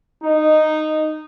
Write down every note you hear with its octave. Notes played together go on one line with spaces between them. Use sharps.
D#4